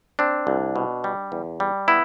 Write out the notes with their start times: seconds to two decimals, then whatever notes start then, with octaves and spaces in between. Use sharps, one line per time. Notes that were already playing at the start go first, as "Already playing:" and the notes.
0.19 C4 D4
0.47 C2
0.76 B2
1.04 G3
1.32 E2
1.60 G3
1.88 B3 E4